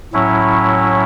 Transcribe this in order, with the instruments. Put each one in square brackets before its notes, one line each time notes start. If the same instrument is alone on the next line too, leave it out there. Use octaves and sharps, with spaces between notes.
[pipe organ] A2 F#3 C#4 E4